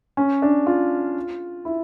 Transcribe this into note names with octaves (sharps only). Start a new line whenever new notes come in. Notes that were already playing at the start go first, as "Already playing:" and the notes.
C#4
D4
F4
E4